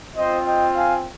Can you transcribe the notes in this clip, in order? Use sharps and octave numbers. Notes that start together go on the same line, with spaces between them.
C4 F4 C5 D#5
D#5 G5
F5 G#5